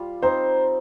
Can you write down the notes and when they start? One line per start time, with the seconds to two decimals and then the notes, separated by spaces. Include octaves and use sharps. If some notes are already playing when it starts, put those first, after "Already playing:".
Already playing: G3 F4
0.22 C4 D#4 C5